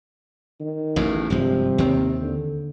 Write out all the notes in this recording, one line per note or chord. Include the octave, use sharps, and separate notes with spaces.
D#3
A1 E2 A2
G#1 G2 C3 F3
D#2 D#3 C4
D3